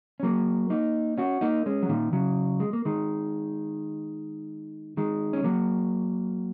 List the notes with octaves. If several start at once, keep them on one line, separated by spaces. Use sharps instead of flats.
C#4
F#3 A#3
A#3 D#4
C#4 F#4
A#3 D#4
G#3 C#4
F#3
A#2 D#3
C#3 F#3
G#3
A#3
D#3 G#3
D#3 G#3
C#4
F#3 A#3